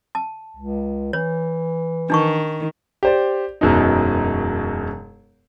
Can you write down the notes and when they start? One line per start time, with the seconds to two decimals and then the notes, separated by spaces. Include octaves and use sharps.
0.15 A5
0.57 C#2
1.13 E3 C#5
2.10 D#3 D4 D#4 C#6
3.03 G4 C5 D5
3.61 E1 F#2 B2 D#4